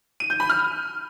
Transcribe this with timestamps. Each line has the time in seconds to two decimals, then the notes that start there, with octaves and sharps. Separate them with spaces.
0.20 D#7
0.30 G6
0.40 B5
0.50 F6